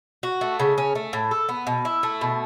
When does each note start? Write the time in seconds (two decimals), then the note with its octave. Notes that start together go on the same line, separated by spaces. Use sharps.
0.23 F#4
0.41 A3
0.60 C#3
0.78 C#4
0.95 A3
1.13 A2
1.31 A4
1.49 B3
1.67 B2
1.85 E4
2.03 A3
2.21 B2